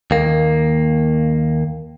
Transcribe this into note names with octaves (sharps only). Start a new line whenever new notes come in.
D#2 A#3